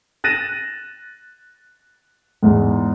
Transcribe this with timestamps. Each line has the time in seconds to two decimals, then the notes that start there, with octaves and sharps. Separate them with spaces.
0.24 F#6 A6 A#6 D#7 E7
2.43 E2 G#2